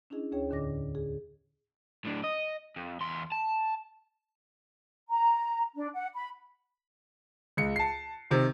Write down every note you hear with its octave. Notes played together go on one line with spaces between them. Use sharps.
C#4 D4 E4 G#4 D#5
D2 C#4 G#4 C#5 G5
E2 A2 D3 D#5 D6 A#6
G#4
A2 D4
D#5
F2
E2 C6
A5
A#5
D4
F#5
B5
C#2 C#7
A5 C7
C3 D#3